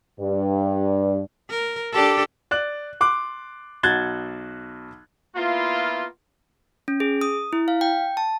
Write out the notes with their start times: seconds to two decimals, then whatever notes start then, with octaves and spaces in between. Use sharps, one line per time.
0.20 G2
1.50 A#4
1.93 D4 G4 A4
2.51 D5 F#6 F#7
3.01 C6 D6 F#6
3.83 B1 F#4 F#6 G#6 A6 G7
5.36 A#3 B3 E4 F4
6.88 C#4
7.00 G#4
7.21 D#6
7.53 E4
7.68 F5
7.81 G5
8.17 A5